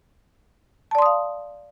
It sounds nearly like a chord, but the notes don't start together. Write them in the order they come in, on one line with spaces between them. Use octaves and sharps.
A5 D5 C6 D#6 F5